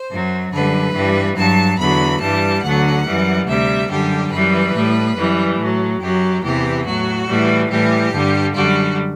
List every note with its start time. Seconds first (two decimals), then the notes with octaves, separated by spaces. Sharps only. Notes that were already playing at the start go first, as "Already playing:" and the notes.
Already playing: C5
0.10 F#2 F#3
0.52 F#2 D3 G3 B4
0.95 G2 E3 G3
1.36 G2 F#3 A5
1.78 E2 D3 F#3 B5
2.21 G2 E3 G3 A5
2.63 D2 D3 F#3 F#5
3.06 F#2 E3 G3
3.48 D2 C3 G3 E5
3.90 F#2 D3 G3 G4
4.31 F#2 E3 G3 B4
4.74 A2 G3
5.16 F#2 E3 G3
5.59 A2 F#3
6.01 F#2 F#3 G4
6.43 E2 C3 E3 G4
6.85 A2 F#3 F#4
7.27 A2 E3 G3
7.70 A2 E3 G3 G4
8.13 G2 D3 G3
8.54 F#2 D3 G3 F#4